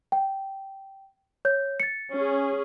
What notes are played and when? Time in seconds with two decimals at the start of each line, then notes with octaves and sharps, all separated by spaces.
0.12 G5
1.45 C#5 G6
1.80 A6 C#7
2.11 C#4 G#4